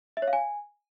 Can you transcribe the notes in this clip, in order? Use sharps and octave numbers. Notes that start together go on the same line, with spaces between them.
E5
C#5
F5
G#5